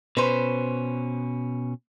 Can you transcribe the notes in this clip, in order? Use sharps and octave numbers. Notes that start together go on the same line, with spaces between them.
B2 C#4 B4 C5